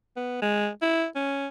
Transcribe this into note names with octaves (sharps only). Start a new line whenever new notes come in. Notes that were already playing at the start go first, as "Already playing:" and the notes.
B3
G#3
E4
C#4